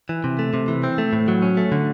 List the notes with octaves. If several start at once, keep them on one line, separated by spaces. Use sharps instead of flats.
E3
C3
A3
C3
E3
C4
A3
A2
F#3
C#4
A3
D3